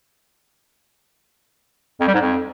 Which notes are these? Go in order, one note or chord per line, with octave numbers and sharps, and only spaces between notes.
F2
G3
G#2
F2